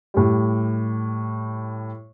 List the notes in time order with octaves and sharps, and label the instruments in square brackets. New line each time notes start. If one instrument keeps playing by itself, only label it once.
[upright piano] A2 G3